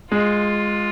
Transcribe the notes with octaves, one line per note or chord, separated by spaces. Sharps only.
G#3 F4